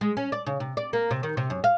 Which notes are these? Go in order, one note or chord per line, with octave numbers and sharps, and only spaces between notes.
G#3
C#4
D5
C#3
C3
D5
A#3
C3
D#3
C3
F#2
F5